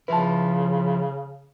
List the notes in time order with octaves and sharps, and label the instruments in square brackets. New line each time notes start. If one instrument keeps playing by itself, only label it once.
[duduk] C#3 [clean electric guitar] F3 E4 [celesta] B4 A5